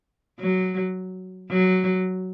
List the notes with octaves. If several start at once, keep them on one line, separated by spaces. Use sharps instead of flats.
F#3
F#3